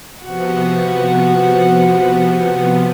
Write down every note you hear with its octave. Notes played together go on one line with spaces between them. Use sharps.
C3 F3 B3 F#4